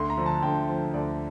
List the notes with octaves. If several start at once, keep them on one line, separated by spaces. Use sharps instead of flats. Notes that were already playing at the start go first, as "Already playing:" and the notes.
Already playing: D2 C6
A#5
D3 F3
A5
D2 G5
D3 F3
D2 D5